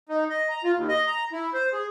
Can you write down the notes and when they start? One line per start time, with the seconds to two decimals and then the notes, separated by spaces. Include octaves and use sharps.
0.09 D#4
0.30 D#5
0.49 A#5
0.64 F4
0.76 D#2
0.89 D#5
1.06 A#5
1.32 E4
1.54 C5
1.73 G#4